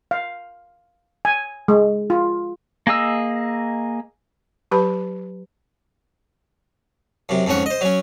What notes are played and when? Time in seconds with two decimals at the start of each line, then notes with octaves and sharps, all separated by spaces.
0.11 F5
1.25 G#5
1.68 G#3
2.10 F4
2.87 A#3 G#4 D#5 E6
4.71 F#3 G4 B4 A5 B5
7.29 F#2 C3
7.46 F2 G#2 C#4 F#5
7.66 C5 D#5
7.81 F#3 C#4